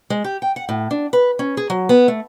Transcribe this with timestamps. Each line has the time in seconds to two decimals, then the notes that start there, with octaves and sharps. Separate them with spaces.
0.10 G#3
0.24 G4
0.42 G5
0.56 F#5
0.69 A2
0.91 D4
1.13 B4
1.39 C#4
1.57 G#4
1.70 F#3
1.89 B3
2.08 A3